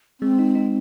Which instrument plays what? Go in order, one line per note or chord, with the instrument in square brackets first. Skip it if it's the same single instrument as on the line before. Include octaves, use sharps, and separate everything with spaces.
[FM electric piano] G#3 [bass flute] C4
[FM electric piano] D#4
D#4